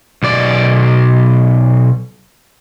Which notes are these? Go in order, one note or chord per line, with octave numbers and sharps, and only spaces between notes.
B1 D5